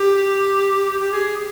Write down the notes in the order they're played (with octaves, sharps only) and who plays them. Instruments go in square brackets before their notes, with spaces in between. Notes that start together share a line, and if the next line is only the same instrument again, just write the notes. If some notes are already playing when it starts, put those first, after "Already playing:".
Already playing: [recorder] G4
G4
G#4